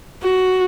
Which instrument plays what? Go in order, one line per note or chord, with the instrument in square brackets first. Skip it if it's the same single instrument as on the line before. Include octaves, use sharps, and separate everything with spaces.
[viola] F#4